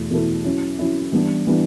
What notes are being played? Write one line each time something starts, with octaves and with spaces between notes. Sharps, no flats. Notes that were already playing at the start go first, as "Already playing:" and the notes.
Already playing: E2 B2 A3 E4
E2 B2 A3 E4 A4
F#3 C#4 E4
F#3 C#4 E4
E3 G3 B3 D4
E3 G3 B3 D4